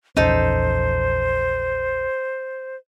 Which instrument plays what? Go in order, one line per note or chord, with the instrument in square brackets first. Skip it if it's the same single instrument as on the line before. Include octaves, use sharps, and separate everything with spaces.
[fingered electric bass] A#1 E2 C#4 [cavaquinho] D#4 A4 [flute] C5